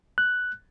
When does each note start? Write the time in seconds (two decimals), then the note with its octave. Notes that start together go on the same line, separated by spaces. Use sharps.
0.18 F#6